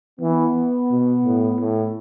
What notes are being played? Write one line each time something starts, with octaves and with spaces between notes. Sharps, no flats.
E3 B3
B2
A2
A2